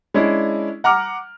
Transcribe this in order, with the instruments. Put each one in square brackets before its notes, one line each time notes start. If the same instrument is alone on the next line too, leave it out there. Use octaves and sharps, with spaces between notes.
[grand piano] G#3 C#4 D4 E4
F#5 A#5 D6 F6